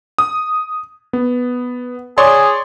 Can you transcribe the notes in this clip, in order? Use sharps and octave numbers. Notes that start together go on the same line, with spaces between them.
D#6
B3
G#4 C#5 D5 C6